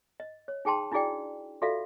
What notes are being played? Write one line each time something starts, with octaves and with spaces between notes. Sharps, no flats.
D#5
C#5
D#4 G#4 G5 A5 C6
D4 E4 F#4 G#4 D5 G5
F4 F#4 A4 D5 E5 F5